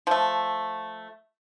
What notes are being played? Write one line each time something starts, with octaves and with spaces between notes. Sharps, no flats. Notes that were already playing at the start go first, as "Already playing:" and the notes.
F3 A3